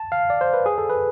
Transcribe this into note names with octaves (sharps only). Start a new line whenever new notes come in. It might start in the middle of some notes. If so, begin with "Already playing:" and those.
Already playing: A5
F5
D5
C5
B4
G#4
A4
B4